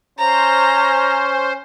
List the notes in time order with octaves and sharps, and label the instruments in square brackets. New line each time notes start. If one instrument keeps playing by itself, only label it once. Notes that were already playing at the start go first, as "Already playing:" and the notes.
[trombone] C#4 [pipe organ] C5 [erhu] A#5